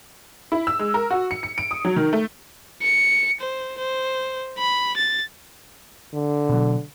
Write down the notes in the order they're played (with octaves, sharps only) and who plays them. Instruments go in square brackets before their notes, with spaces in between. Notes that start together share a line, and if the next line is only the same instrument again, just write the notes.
[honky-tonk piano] E4
E6
G#3
A#4
F#4
C#7
C#7
D7
D#6
F#3
D#3
A3
[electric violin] C#7
C5
C5
B5
A6
[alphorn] D3
[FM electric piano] B2 F#3